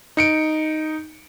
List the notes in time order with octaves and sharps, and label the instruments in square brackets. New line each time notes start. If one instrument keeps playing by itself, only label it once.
[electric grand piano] D#4 C#7 D7